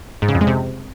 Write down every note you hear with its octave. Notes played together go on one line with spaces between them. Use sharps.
G#2
C#3
F2
G#3
C3